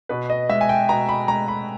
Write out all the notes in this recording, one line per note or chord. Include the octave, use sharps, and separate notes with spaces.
B2 B4
D#5
G#3 E5
G#5
G5
B2 A#5
B5
G#3 A#5
B5